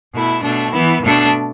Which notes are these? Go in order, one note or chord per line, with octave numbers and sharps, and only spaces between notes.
B2 A3 E4
B2 A3 D4
E3 B3 E4
B2 A3 D4